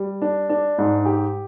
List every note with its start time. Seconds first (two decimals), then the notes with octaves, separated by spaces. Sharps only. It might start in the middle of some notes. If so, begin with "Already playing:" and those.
Already playing: G3
0.22 D4
0.49 D4
0.78 G#2
1.05 G4